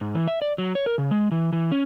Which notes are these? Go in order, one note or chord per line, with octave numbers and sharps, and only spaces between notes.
G#2
E3
E5
D5
F#3
C#5
A#4
C#3
G#3
E3
E3
C#4